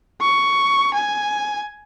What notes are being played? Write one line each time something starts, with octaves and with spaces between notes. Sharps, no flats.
C#6
G#5